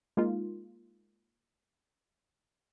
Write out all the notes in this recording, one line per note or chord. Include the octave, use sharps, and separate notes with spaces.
G#3 A#3 D#4 F4